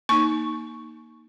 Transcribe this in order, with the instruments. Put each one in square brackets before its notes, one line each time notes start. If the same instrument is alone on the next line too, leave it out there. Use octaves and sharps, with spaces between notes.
[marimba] A#3 D#4 [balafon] C#6